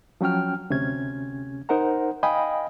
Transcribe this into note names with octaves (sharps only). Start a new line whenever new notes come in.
F3 F#3 C#4 G5 F6
D2 C3 C#4 G#6
D#4 A#4 C5 F#5 A#5
D#5 F5 G5 G#5 B5 D#6